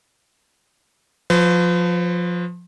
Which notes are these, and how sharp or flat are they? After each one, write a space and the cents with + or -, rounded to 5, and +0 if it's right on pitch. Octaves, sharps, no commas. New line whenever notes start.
F3 +20 B4 +45